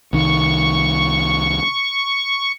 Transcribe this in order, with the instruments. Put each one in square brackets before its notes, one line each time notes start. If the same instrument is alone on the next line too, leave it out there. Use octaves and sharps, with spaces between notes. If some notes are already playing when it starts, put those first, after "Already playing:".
[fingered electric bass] C2 D#3 [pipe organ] C#6